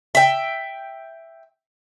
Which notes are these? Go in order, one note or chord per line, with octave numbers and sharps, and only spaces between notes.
E5 G5